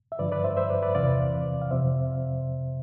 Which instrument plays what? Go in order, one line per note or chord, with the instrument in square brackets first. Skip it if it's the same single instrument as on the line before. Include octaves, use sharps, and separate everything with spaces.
[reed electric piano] E5
G2 D3 F3 B4 D5
B4 D5
C5 E5
C5 E5
B4 D5
B4 D5
E2 C3 E3 D5 F5
F5
F2 C3 F3 C5 E5